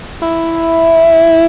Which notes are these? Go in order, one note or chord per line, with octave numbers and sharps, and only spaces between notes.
E4